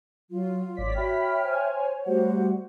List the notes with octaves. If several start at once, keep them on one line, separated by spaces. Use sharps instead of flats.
F#3 F4
G#1 C#5 D5 B6
F#4 E5 G5 B5 F6 B6
C5 G#5
G3 A3 F#4 C5 F#5